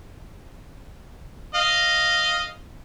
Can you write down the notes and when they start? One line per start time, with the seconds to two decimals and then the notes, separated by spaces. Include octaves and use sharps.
1.55 D#5 F5